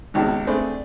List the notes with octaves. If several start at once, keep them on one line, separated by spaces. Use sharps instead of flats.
G#1 C#2 G#2 B2 G4 A5
A3 C4 D4 G#4 B4 C5